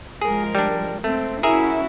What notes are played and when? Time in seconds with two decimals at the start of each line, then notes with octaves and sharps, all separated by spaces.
0.22 F3 G#3 G#4 A#4
0.55 G3 D4
1.04 A3 C4
1.43 C#4 E4 F#4 G#4 A#4 E5